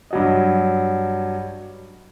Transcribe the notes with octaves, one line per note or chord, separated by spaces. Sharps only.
G2 F#3 D#5